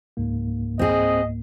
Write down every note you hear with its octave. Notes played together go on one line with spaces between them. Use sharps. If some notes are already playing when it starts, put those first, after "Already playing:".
C#2 G#2 A#3
C4 G#4 D#5